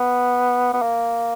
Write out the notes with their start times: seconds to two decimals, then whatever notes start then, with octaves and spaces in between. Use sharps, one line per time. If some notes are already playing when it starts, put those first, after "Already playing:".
Already playing: B3
0.74 B3
0.82 A#3